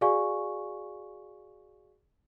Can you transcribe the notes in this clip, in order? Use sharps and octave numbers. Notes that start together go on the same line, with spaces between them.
F#4 G#4 D5 F5 G#5 C#6